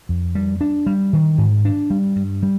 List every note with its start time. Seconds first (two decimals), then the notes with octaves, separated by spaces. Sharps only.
0.09 F2
0.35 G3
0.61 D4
0.86 G3
1.13 D#3
1.38 G#2
1.65 D4
1.90 G3
2.16 G2
2.43 G3